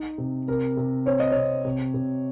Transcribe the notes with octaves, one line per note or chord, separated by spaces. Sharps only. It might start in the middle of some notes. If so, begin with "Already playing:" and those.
Already playing: D#4
C3
C3 A#4
C3
C4 C#5
D#5
C3 C#5
C3
C3